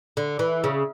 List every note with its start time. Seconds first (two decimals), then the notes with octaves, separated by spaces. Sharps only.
0.17 D3
0.39 E3
0.64 C#3